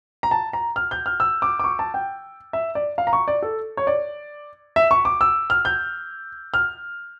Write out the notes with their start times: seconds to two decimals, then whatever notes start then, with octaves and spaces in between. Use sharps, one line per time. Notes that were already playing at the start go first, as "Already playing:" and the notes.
0.23 A#5
0.31 A5
0.53 A#5
0.76 F6
0.91 G6
1.06 F6
1.20 E6
1.42 D6
1.59 D6
1.64 C#6
1.79 A5
1.94 G5
2.53 E5
2.75 D5
2.98 F5
3.07 A#5
3.13 C#6
3.28 D5
3.42 A4
3.77 C#5
3.87 D5
4.76 E5
4.91 C#6
5.05 D6
5.21 E6
5.50 F6
5.65 G6
6.54 F6